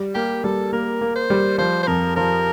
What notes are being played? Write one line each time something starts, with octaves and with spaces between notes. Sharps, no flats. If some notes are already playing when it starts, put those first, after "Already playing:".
Already playing: G3
A#3 G4
G3 A4
A#3 A#4
A#3
C5
G3
F3 C5
C5
F2 A#4
F3 A#4